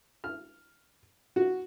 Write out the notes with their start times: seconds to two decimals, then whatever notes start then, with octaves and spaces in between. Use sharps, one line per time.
0.24 F6
1.36 F#4